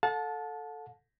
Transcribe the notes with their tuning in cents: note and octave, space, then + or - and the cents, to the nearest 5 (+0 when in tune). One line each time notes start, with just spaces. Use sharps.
A4 +0 F#5 -45 A5 -15